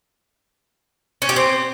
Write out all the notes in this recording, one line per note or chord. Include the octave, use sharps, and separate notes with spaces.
C#4
G4
C4